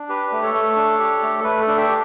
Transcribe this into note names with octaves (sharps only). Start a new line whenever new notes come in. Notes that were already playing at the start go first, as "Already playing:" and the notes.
Already playing: D4
G4 B4
A3
A4 C#5
A3
D4
G4
A3
A4
A3 B4
A4
D4
E5 G5
G4